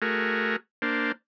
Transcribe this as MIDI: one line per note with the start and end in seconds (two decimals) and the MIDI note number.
0.02 0.56 57
0.02 0.56 66
0.02 0.56 68
0.02 0.56 70
0.82 1.12 58
0.82 1.12 62
0.82 1.12 72